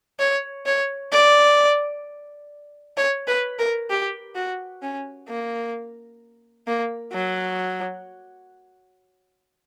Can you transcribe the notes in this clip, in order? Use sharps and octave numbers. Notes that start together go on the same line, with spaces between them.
C#5
C#5
D5
C#5
B4
A#4
G4
F#4
C#4
A#3
A#3
F#3